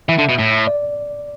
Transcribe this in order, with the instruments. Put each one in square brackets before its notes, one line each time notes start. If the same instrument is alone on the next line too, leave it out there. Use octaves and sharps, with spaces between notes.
[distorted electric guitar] E3 [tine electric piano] E5
[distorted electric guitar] D3
B2
A2
[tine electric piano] D5